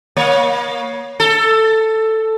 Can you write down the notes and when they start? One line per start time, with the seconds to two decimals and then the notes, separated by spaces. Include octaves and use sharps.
0.17 A#3 C#5
1.20 A4